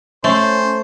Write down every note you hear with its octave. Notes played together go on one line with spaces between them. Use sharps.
A3 C#4 C5